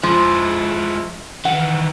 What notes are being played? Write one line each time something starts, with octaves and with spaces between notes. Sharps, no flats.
F3 G#3 E4
D#3 E3 F#5